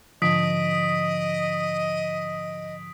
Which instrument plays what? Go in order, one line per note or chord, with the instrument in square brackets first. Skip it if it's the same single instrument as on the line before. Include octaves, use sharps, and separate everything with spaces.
[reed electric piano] G#2 D3 F3 [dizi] D#5 [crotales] D#6 B6 D7